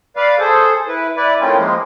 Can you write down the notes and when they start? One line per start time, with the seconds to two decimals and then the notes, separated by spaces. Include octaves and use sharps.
0.17 B4 D5 F5
0.39 G#4 A4 C5
0.88 E4 B4
1.17 E4 B4 D5
1.40 D#3 A3 C4 C#4 E4 F4
1.57 F3 G#3 A#3